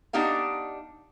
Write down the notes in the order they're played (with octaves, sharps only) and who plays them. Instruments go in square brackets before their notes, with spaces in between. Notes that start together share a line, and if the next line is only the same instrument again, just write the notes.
[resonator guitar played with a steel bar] B3 D4 D#4 G4 F5 F#5